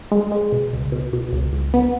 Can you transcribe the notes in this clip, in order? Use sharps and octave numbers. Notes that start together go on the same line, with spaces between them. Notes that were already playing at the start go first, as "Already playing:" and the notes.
G#3
G#3
B2
C#2
B2
B2
C#2
C#2
B3